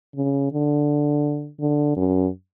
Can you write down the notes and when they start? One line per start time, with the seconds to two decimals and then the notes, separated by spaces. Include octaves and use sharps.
0.16 C#3
0.52 D3
1.60 D3
1.96 F#2